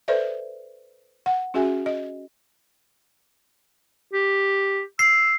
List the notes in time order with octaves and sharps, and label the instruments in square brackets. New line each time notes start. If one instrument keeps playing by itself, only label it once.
[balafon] A4 B4 C5 D5 E5
F#5
C#4 F#4 G#4 E5 G#5
D#5
[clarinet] G4
[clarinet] E6 [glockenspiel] C7